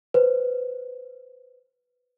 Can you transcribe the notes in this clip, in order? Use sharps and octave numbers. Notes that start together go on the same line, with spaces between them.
B4 C5